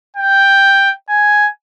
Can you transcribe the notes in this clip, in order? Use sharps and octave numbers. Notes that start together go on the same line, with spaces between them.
G5
G#5